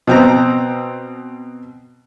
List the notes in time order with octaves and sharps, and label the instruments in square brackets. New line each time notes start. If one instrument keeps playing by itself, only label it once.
[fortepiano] B2 C4 A#5